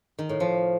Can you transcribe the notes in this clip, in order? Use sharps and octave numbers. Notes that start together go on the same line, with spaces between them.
D#3
A2
F3